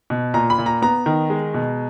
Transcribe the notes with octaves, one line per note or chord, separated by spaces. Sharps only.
B2
A#2 A#5
B5
A#2
A#5
B3 A#5
D#3
G#3
B2